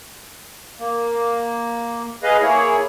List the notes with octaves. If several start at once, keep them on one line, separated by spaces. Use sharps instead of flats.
A#3
G#4 B4 D#5 F5
A#3 E4 G#4 C#5